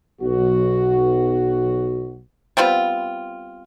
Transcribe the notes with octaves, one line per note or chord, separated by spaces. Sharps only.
B1 F#4
G3 B3 C4 F4